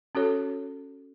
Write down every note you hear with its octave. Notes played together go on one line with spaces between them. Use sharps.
C#4 F#4 A4 C#5